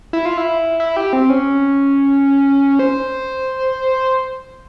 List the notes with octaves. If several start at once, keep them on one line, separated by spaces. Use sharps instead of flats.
E4
F4
E4
E4
G4
C4
C#4
C5